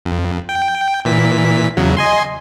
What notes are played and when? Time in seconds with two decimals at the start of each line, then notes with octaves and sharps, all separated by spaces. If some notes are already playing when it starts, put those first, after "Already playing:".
0.05 F2
0.49 G5
1.05 A#2 E3 B6
1.77 E2 C#3 F#3
1.97 D#5 G#5 C6